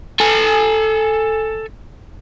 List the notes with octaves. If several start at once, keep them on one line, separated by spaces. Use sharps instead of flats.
A4 G#5